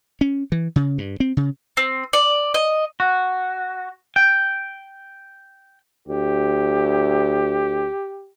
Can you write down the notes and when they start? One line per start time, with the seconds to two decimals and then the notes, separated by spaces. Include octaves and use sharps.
0.21 C#4
0.52 E3
0.76 C#3
0.98 G2
1.20 C4
1.37 C#3
1.77 C4
2.13 D5
2.54 D#5
3.00 F#4
4.16 G5
6.08 D2 G4